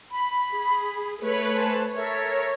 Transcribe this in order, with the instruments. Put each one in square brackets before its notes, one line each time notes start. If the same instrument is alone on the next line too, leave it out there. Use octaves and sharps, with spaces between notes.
[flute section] B5
[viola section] G#4
A3 B4 C#5
[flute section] C5 G#5 A5
[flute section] A4 A#4 E5 [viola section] C#5